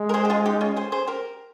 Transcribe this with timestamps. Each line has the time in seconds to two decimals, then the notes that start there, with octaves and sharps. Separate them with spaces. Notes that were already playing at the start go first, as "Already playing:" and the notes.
Already playing: G#3
0.09 A#4
0.14 G#4 C5
0.25 G4
0.30 F4 G#4
0.46 D#4 G4
0.61 C#4 F4
0.76 G#4 C5
0.92 G#4 C5
1.07 G4 A#4